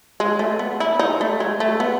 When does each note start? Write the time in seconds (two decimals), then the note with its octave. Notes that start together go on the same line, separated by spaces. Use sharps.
0.20 G#3
0.39 A3
0.59 B3
0.80 E4
0.99 D#4
1.21 A3
1.40 G#3
1.60 A3
1.80 B3